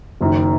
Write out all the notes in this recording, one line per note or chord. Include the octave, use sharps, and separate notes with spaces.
F#1 F#2 D#3